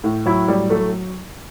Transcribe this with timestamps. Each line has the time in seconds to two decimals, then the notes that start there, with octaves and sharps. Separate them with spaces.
0.04 A2
0.26 F#3 E4
0.48 A2 G3
0.70 F#3 A3